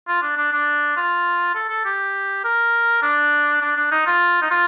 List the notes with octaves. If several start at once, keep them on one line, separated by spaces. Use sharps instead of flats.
F4
D4
D4
D4
F4
A4
A4
G4
A#4
D4
D4
D4
D#4
F4
D#4
F4